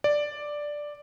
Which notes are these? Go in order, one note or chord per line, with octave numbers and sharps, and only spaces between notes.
D5